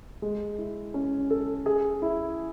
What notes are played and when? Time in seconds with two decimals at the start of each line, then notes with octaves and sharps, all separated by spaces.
0.22 G#3
0.58 E4
0.94 C#4
1.30 A4
1.66 G#4
2.02 E4